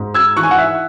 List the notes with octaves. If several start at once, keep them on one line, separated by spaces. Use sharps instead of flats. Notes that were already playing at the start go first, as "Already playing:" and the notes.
Already playing: G#2
E6 G#6
E3 C#6 F#6
G#5
F#5
E5